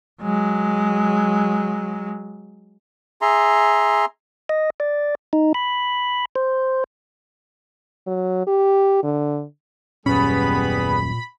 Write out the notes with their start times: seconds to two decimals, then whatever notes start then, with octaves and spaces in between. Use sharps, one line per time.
0.22 F#3 G#3
3.21 G#4 E5 A#5 C6
4.49 D#5
4.80 D5
5.33 D#4
5.54 B5
6.36 C5
8.07 F#3
8.47 G4
9.04 D3
10.06 D#1 F#2 A#2 G3 B3 C#4 G#4 B5